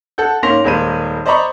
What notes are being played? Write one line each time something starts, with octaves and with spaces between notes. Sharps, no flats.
A4 F#5 G6
G#2 A#3 C#4 C6 A#6 F7
D#1 G#3 A#3 C5 B5 D#7
C5 D5 D#5 A#5 B5 C#6